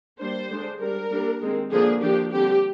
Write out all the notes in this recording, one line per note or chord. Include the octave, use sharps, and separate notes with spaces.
G3 A#3 D4 C5
D3 G#3 D4
G3 D4 A#4
G3 A#3 D4
D#3 G#3 C4
D3 F3 A#3 D4 G#4
F3 A#3 D4 G4
D3 G3 C4 G4